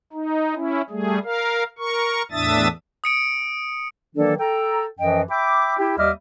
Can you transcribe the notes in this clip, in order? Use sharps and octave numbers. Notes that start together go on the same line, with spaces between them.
D#4
C#4 E4
G3 A3 G#4
A#4 F5
A#4 C#6
E2 A2 D4 E5 D#6 A6
D#6 C#7 D7
D#3 E3 F#3 A#3 D4 A4
A4 G5 A#5
F#2 E3 F3 C#4 D#5 G5
E5 G5 B5 D6
E4 G4
D#2 G3 D#5 E5 D6 F6